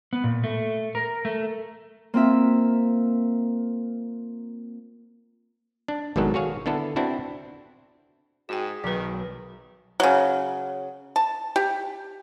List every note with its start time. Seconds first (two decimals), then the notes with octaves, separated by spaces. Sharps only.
0.13 B3
0.24 A#2
0.44 A3
0.95 A#4
1.25 A3
2.14 A#3 C4 F4 E5
5.88 D4
6.16 G#1 G#2 B2 D#3 F#3 A4
6.34 F#4 G#4 C#5 F5
6.66 D3 B3 E4 A4
6.96 C4 D4 E4 F#4
8.49 G#2 F#4 G#4 G5
8.84 B1 D#3 F#3 B4
10.00 C#3 F#3
11.16 A5
11.56 G4